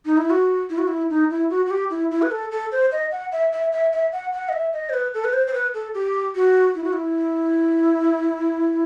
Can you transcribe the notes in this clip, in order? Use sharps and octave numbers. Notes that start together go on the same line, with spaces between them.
D#4
E4
F#4
E4
F#4
E4
D#4
E4
F#4
F#4
G4
E4
E4
B4
A4
A4
C5
D#5
F#5
E5
E5
E5
E5
F#5
F#5
D#5
E5
D#5
C5
B4
A4
B4
C5
C5
B4
A4
G4
F#4
E4
F#4
E4